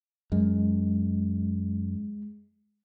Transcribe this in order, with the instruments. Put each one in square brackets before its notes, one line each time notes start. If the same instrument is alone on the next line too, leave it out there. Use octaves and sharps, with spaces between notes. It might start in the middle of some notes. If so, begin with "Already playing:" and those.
[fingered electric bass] F#2 [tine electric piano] G#3